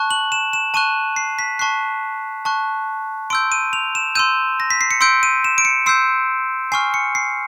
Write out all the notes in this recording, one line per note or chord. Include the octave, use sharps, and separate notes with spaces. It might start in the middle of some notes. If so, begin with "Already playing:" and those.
Already playing: A5 C#6 F#6
F#7
E7
E7
A5 C#6 F#6 D#7
C7
B6
A5 C#6 F#6 C7
A5 C#6 F#6
C6 E6 G6 D7
D#7
F7
E7
C6 E6 G6 D#7
A#6
B6
C7
C#7
C6 E6 G6 D7
D#7
E7
D7
C#7
C6 E6 G6 C7
G#5 C#6 F6 C7
C#7
C7